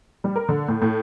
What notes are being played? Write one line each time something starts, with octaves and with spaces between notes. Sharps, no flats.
G3
A#4
D3
A2
A2